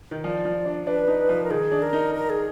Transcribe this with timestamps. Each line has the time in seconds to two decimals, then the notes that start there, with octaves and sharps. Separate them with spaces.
0.11 D#3
0.24 F3 D5
0.45 F3
0.65 D4
0.87 D4 B4
1.08 D#4
1.29 F3
1.44 A#4
1.50 D#3 G#4
1.72 D4
1.82 A#4
1.93 D#4
2.15 A#4
2.30 G#4